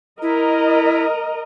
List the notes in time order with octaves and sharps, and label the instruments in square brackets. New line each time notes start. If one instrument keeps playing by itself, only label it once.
[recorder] E4 [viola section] A#4 D#5